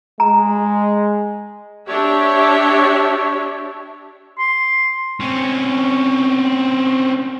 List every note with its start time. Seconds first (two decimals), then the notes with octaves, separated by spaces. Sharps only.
0.20 G#3 A#5
1.87 D4 G4 C#5 E5
4.39 C6
5.20 C4 C#4